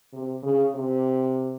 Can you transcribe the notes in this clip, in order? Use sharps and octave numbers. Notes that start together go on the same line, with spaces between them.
C3
C#3
C3